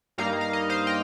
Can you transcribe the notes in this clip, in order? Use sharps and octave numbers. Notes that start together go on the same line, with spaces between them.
G2 G3 A#3 D#4 F5 A#5
F5
D#5
C5 F5
D#5 G5